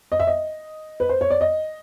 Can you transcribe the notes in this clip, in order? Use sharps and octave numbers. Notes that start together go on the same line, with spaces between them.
D#5
E5
D#5
B4
C5
C#5
D5
D#5